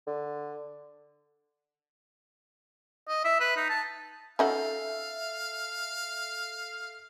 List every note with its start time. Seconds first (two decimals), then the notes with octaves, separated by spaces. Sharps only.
0.07 D3
3.08 D#5
3.24 E5
3.40 B4
3.56 D#4
3.69 A5
4.39 C#4 D#4 F#4 A4 E5 F5